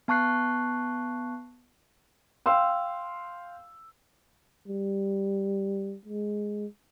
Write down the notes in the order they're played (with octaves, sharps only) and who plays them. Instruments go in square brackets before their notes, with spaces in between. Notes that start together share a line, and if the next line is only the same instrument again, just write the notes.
[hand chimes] B3 A5 C#6 F#6 C7
[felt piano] F5 G5 C6 E6
[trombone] G3
G#3